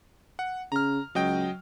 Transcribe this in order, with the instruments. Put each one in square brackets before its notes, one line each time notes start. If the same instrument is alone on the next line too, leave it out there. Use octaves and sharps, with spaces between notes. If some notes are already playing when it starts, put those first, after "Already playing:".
[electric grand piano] F#5
[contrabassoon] C#3 [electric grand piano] A#5 F6
[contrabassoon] C#2 [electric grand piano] F#3 D#5 G5